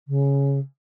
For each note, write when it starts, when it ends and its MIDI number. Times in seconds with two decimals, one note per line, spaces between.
0.08 0.59 49